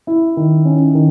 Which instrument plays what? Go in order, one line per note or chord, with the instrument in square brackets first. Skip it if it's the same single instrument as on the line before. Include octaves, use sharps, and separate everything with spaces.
[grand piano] E4
D#3
C#4
D#3